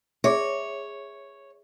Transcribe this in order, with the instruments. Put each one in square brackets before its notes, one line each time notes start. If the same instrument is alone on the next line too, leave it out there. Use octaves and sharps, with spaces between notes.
[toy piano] G#4 E5 [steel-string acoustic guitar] C#5